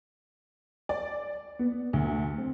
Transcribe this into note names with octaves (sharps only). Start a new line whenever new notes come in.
D5
B3
D2
C4